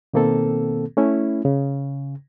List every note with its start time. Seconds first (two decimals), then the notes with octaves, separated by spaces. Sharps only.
0.14 B2 D#3 A#3 C4 A4
0.97 A3 C#4 E4
1.45 C#3